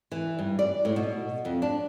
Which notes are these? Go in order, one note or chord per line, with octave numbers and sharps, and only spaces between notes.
E3
G2
D5
A2
B2
F2
D4